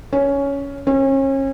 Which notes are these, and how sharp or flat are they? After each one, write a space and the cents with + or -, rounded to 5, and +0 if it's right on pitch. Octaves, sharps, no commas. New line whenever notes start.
C#4 +10
C#4 -35